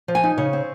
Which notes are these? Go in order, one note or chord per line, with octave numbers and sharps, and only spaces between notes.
F3
G#5
D#4
C#3 C#5
C4